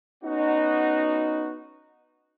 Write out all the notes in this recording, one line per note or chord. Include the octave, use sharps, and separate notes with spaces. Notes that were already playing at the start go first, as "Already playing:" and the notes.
B3 C#4 D#4 F#4